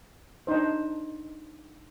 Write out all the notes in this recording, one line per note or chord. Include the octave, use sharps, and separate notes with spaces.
D4 D#4 C5